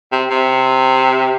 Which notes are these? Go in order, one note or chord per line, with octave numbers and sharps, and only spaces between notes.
C3
C3